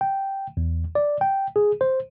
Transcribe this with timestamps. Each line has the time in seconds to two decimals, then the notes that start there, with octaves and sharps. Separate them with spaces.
0.01 G5
0.57 E2
0.95 D5
1.21 G5
1.56 G#4
1.81 C5